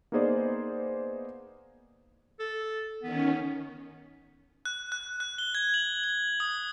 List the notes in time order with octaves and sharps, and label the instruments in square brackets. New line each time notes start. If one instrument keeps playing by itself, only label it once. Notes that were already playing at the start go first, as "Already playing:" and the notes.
[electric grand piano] A#3 B3 D#4 G#4 C5 D5
[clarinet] A4
[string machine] D#3 C#4 [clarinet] B3
[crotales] F#6
F#6
F#6
G7
G#6
F#7
F#7
D#6